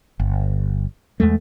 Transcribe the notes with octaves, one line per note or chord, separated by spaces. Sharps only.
G1
E2 G2 G#3 A3